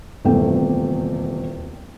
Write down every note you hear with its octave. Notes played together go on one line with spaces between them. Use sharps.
D#1 E2 C3 A3 G5